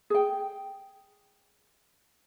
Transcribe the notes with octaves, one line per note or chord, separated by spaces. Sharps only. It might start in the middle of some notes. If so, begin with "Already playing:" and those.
G#4 G5